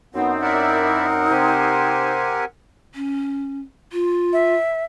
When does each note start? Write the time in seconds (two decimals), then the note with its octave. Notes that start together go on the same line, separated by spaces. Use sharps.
0.15 F#2 B3 C4 D#4
0.42 E4 A#4 D5 E5 F#5
1.30 C3 C4 G4 C5 G#5
2.94 C#4
3.93 F4
4.33 E5